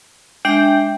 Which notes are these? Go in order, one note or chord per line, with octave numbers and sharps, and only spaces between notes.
G#3 D4 E5 G5